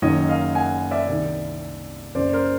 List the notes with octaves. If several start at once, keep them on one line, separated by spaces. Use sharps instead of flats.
F#1 F#2 D#3 F#3 C#5 D#5
D#5 F5
F#5 G#5
D5 E5
C2 C3 D#3
F#1 F#2 C#3 C5 D5
A#4 C5